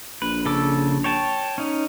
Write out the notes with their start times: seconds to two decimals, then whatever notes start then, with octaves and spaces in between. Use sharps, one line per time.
0.22 A#1 B4
0.46 C#3 A4 D6
1.04 C#5 G5 A5
1.58 C#4 D#4